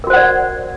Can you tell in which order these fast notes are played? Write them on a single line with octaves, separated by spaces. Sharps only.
A#4 F#4 C5 F#5 D5